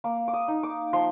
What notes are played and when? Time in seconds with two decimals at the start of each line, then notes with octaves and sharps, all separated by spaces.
0.04 A#3 D6
0.28 D6
0.34 D#6
0.48 D#4
0.63 D6
0.93 F3 C6